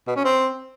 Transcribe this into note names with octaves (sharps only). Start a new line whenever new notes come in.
B2
C#4
C4